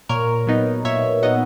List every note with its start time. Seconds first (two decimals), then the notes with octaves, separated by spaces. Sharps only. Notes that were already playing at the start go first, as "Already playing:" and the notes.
0.09 A#2 A#4 C#5
0.47 F#3 B3 D#4
0.84 A#2 C#5 E5
1.22 F#3 B3 D#4 D#5 F#5